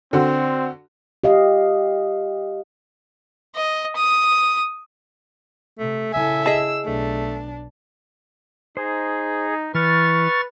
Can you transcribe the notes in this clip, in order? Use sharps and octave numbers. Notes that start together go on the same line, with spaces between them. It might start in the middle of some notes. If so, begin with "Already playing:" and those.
D3 C4 F#4
G4 D#5 F5
D#5
D#6
C3 A3
C#3 E4 A4 E5 G#5
G#4 D#5 A5 E6
B1 A3 D4
D#4 G#4 C5
E3 B4 C#6 F6 A6